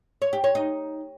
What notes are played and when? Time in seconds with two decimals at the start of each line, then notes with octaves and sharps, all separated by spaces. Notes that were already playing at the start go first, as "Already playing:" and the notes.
0.22 C#5
0.33 G4
0.44 C#5
0.55 D#4